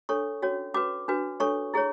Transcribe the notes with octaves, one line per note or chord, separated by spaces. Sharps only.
D4 A4 C#5 C#6
C#4 F#4 C#5
C#4 F#4 B4 D6
D4 F#4 B4
D4 A4 C#5 C#6
E4 G#4 C#5